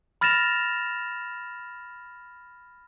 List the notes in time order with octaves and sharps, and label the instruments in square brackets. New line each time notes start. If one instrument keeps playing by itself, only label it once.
[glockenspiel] B5 F6 A6 A#6 E7 F7